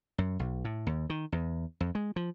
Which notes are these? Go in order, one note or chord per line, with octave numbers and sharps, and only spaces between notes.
F#2
B1
A2
D#2
D#3
E2
F2
G#3
F3